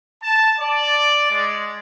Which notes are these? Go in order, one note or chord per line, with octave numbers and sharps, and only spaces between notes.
A5
D5
G#3